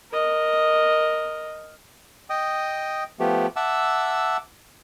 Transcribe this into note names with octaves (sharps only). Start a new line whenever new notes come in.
A#4 D#5
D#5 G5 D#6
F3 A3 B3 G4
E5 F#5 A5 D6 E6